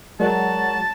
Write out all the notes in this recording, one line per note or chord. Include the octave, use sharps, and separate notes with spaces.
F#3 G#3 A#4 C#5 D5 A5